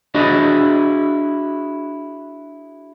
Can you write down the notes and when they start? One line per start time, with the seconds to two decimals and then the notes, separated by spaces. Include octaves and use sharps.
0.14 D4 E4 F#4 G#4 D#5